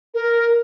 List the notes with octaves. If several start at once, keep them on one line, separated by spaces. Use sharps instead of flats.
A#4